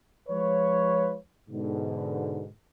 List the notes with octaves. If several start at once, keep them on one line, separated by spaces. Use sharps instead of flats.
F3 G#3 F4 B4 C#5
G#2 B2 D3